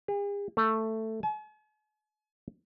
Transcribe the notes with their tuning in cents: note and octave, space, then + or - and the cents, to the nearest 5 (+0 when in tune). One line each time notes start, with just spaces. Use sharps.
G#4 -45
A3 +10
G#5 +45